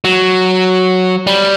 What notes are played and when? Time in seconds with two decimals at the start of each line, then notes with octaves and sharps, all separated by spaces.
0.04 F#3
1.27 G3